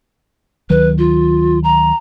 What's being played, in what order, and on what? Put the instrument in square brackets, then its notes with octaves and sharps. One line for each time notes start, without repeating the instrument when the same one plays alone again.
[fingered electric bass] D2 D#3 F#3 [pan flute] B4
[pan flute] F4
A#5